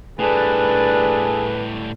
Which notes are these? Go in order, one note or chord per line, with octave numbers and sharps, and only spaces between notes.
A2 G3 D4 G#4 A4 B4